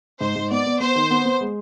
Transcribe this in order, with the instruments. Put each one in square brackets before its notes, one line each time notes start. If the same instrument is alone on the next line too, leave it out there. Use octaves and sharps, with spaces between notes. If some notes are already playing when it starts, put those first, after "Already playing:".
[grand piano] G#2 [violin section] C5
[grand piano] G#2
[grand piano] B3 [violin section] D5
[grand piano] B3
[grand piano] B3 [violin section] C5
[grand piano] D#3
B3
B3
G#3